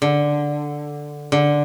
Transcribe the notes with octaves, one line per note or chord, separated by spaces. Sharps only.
D3
D3